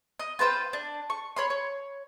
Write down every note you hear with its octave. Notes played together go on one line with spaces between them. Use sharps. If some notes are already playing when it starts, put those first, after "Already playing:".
D#5
F4 B4 C5 G5
D4
C#6
C#5 B5 C6
C#5